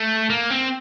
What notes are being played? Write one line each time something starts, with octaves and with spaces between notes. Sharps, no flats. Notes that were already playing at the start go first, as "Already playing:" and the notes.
Already playing: A3
A#3
C4